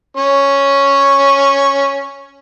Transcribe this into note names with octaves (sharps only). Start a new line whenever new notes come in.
C#4 C#6